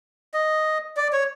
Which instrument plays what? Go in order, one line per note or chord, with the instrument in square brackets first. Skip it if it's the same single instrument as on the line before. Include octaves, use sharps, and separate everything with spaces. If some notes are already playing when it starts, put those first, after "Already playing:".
[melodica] D#5
D5
C#5